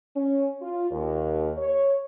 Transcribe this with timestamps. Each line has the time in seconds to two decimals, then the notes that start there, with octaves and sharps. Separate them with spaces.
0.16 C#4
0.61 F4
0.91 D#2
1.58 C#5